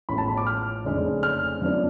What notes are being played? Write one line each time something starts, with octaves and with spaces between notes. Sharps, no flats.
A1 A2 F3 G#3 B3 B5
A5
B5
D6
F6
F1 F2 C#3 G#3 D4
F6
F#2 F3 B3 D4